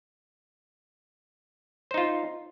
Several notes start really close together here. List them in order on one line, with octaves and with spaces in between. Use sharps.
C5 D#4 F4